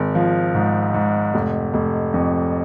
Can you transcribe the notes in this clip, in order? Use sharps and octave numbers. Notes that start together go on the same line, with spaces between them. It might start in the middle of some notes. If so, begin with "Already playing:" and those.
Already playing: G#1
F3
G#2
G#2
F1
F1
F2